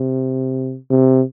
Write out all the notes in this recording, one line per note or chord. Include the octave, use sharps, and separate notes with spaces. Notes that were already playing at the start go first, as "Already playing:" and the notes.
Already playing: C3
C3